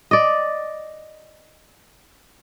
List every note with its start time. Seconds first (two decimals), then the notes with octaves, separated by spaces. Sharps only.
0.11 D5 D#5